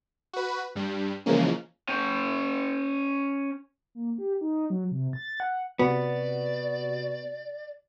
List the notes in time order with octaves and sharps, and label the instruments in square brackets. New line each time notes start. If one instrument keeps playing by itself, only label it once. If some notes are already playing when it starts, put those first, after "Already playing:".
[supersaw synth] F#4 B4
G2 G3
C#3 E3 F3 G#3 A#3 C#4
[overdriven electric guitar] C#4 G5
[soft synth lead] A#3
G4
D#4
F#3
C3
A6
F#5
[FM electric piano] C3 F#4 [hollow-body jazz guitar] B3 [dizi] D5